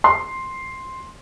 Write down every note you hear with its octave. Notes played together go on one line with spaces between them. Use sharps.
C6